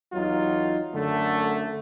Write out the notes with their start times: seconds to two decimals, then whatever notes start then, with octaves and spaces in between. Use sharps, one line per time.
0.12 E2 F#3 D#4 F4
0.94 F#2 D3 A3